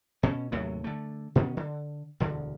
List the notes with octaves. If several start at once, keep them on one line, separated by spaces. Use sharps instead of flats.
B2 C#4
D#2 A2 C3 F#3
D3 A3
B2 D#3 B3 C#4
D3
E1 D2 D3